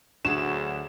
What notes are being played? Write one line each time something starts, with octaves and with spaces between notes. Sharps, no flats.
D2 F#3 D4 F#4 G#4 E7